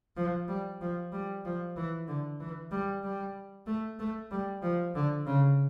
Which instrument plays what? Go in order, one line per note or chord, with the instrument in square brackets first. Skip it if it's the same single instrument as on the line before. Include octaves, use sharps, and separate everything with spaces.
[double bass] F3
G3
F3
G3
F3
E3
D3
E3
G3
G3
A3
A3
G3
F3
D3
C#3